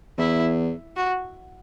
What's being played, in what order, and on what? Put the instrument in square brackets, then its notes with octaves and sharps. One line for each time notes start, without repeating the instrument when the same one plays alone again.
[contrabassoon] E2 [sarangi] E4
[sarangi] F#4